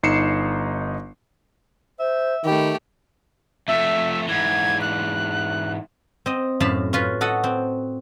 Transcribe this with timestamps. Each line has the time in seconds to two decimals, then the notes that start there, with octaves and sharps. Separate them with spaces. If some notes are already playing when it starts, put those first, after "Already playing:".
0.03 G1 D#4 C7 C#7 E7
1.99 C5 E5
2.45 D#3 A3 G4 B5
3.68 F2 A3 E5
4.28 G#2 E3 G#6
4.81 F#6
6.26 C4 D#5
6.60 F#2 A2 F5 A5 B5
6.93 C#4 F4 B4
7.21 F#4 A4 D#5 F#5
7.44 C4